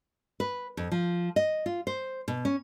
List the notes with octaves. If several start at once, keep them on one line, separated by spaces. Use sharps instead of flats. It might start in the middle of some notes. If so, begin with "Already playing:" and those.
B4
F2
F3
D#5
F4
C5
B2
C#4